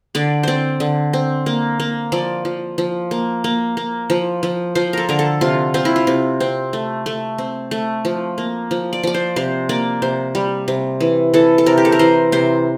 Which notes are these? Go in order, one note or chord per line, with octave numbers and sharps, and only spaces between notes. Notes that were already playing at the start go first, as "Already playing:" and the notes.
D3 D5
C4 C5 D5
D3
C4
A#3
A#3
F3 D5
F3
F3
A#3
A#3
A#3
F3
F3
F3 C5
A4 A#4
D3 A#4
A4
C3 F4
C4 F4
E4
F4
C3
C4
A3
A3
C4
A3
F3
A#3
F3
D5
F3 D5
C5
C3 C5
A#3 D5
C3 C5
G3
C3
E3
E3 A4
A4
C3 A#4
G4
A4
A#4
E3 C5
C3 C5